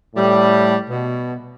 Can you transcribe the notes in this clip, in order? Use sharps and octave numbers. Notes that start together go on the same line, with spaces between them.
A2 G3
B2